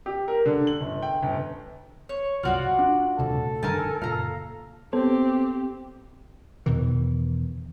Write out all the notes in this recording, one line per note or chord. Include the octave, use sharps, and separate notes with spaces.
G4
A#4
D3
F#7
G1
G5
G1
C#5
G1 C2 F#3 F4 F#4 D5
D4
D#1 D2 C3 A4
G2 D3 D#3 A#4 G#5 A5
F#1 A#2 F5 A#5
B3 C4 G4 A4 C5
E2 B2 D#3 E3